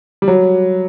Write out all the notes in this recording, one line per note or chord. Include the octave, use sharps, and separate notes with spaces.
G3
F#3